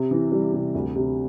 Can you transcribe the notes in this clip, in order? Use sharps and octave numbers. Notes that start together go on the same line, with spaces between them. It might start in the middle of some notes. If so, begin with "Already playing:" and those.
Already playing: C3
E3
G3
C3
D2
C3